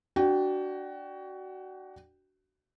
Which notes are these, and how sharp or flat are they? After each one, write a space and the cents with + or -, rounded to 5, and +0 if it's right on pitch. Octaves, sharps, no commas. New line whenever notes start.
D4 +0 F#4 +20 G5 +0